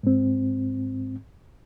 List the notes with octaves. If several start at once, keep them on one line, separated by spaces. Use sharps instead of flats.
G#2 C4